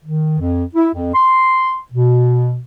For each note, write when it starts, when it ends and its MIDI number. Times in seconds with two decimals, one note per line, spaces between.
0.04 0.38 51
0.39 0.63 41
0.75 0.89 64
0.94 1.13 41
1.14 1.79 84
1.92 2.60 47